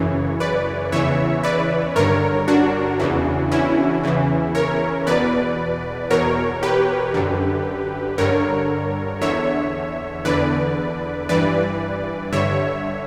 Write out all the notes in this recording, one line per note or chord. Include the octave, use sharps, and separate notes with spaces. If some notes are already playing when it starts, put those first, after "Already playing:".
Already playing: F#2 C#3 E3 C#5
B4 D5
E2 C#3 E3 C#5 E5
B4 D5
G2 D3 A#4 C#5
D4 F#4
E2 C#3 E3
C#4 E4
E2 C#3 E3
A#4 C#5
E2 B2 B4 D5
E2 B2 A#4 C#5
G4 B4
F#2 D3
G2 D3 A#4 C#5
E2 D3 C#5 E5
E2 D3 B4 D5
G2 E3 B4 D5
G2 D3 C#5 E5